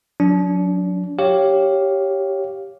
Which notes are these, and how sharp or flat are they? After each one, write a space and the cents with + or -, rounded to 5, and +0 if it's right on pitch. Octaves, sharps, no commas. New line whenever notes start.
F#3 -30 D4 -35
G4 -5 C#5 +0 F5 +0